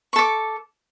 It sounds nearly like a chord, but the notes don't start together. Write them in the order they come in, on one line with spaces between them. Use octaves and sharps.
C#6 A4 D6